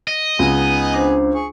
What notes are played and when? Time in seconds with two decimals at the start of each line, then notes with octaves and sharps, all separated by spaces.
0.08 D#5
0.39 C#2 B3 D#4 G#4
0.94 D4 C5
1.35 G#4 C#6